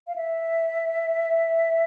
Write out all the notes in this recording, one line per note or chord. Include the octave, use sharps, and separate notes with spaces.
F5
E5